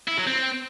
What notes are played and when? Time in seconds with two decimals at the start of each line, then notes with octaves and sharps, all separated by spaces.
0.08 E4
0.17 F#3
0.27 C4